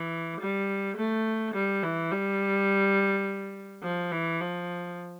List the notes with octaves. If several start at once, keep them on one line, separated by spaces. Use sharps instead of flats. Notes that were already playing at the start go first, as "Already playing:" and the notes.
Already playing: E3
G3
A3
G3
E3
G3
F3
E3
F3